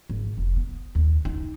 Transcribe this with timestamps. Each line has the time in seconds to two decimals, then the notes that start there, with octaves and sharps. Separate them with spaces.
0.10 G#1
0.37 F1
0.56 B3
0.95 D#2
1.25 D#4